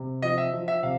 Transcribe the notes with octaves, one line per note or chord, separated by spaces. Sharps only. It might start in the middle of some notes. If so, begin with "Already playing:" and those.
Already playing: C3
F3 D#5
E5
F3
E5
C3 F5